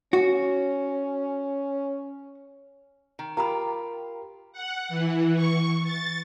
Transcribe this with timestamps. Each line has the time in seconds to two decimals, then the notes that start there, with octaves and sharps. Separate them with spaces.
0.13 C#4 F#4
3.19 D#3
3.37 F4 G4 A#4 A#5 B5
4.53 F#5
4.89 E3
5.35 C#6
5.84 A6